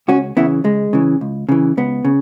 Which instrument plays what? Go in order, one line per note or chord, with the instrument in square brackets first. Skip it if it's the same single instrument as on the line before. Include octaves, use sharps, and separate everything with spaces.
[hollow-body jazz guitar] C#2 C#4 F#4
C#3 E3 B3 E4
C#2 G#3
C#3 E3
C#2
C#3 E3
C#2 B3
C#3